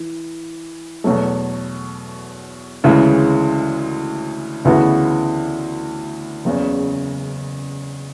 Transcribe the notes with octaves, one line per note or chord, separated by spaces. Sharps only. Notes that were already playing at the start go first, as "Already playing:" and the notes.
Already playing: E3
E2 B2 F#3 A3
D2 C#3 E3 G#3
D2 C#3 E3 B3 F#4
F#1 E2 C#3